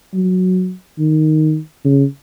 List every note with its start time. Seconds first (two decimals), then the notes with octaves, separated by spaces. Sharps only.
0.14 F#3
0.99 D#3
1.84 C#3